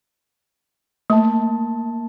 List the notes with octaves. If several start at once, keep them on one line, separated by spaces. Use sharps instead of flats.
A3 A#3 A5